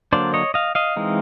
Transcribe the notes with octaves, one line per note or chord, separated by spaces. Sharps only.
D3 F#3 A#3 D4 C5 D5
C#5 D#5
D#5 F5
D#5 F5
E3 G#3 C4 D#4